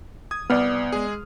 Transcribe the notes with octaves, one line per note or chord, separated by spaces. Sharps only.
D#6 G#6
C2 B3 D5 F6
G#3 G#4